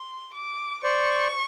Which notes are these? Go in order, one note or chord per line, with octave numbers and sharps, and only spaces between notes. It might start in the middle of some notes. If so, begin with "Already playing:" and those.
Already playing: C6
D6
C5 D5 C#6